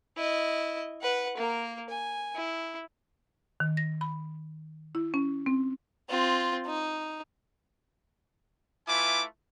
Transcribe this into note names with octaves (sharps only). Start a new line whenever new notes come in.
E4 D#5
B4 F#5
A#3 A#4
G#5
E4
D#3
A#6
B5
E4
C#4
C4
C4 F4
D#4
A3 E4 F4 B4 G#5 D6